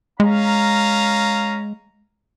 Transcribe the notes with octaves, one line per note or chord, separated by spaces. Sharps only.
G#3 C#4 F5 A#5